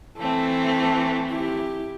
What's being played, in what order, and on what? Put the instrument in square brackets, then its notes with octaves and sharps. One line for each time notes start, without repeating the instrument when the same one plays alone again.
[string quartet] E3 A3 C4 [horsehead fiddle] A4
[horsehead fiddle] E4 G4